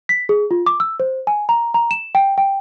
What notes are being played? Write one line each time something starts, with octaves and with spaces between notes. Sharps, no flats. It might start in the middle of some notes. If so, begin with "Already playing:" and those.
B6
G#4
F4
D6
E6
C5
G#5
A#5
A#5
E7
G5
G5